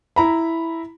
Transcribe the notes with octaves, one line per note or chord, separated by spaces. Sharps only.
E4 A#5 B5